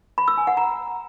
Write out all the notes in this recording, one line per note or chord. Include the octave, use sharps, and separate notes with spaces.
B5
E6
G#5
F#5
A#5